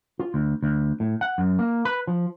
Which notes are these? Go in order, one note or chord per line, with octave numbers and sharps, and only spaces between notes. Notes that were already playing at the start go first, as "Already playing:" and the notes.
F4
D2
D2
A2
F#5
F#2
A#3
B4
F3